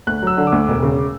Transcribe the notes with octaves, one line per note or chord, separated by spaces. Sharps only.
D2 F#6
F#3 E6
D3
D6
D2
E1
C#3